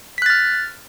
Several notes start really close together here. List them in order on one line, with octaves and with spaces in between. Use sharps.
B6 F#6 A6 F6